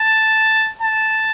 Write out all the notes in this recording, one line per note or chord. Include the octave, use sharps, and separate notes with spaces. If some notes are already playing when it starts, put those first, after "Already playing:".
Already playing: A5
A5